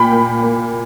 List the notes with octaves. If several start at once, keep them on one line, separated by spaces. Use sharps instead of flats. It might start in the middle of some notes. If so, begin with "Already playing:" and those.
Already playing: A#2 G5 B5
A#3
A#3